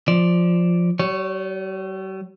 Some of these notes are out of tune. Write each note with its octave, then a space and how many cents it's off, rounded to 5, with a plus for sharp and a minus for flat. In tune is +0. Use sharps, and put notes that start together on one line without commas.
F3 +0 D5 +0
G3 -45 C#5 +0